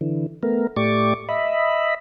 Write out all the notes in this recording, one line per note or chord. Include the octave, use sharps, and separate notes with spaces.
D3 E3
A3 B3 A#4
A2 A3 G4 D5 C#6 D6
D#5 E5 B5